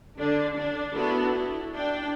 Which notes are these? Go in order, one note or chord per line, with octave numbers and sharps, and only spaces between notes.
D3 D4
D4
B3 D4 E4 F#4 A4
E4
D4 G5